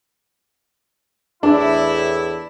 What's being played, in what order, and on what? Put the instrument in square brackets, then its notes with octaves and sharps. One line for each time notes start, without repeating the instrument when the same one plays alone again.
[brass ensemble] E2 A2 E4 [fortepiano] D4